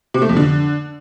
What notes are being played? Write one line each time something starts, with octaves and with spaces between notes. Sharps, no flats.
C3
A3
F2
D3